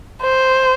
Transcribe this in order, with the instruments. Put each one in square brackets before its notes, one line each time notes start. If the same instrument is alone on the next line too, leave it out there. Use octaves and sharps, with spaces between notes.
[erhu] C5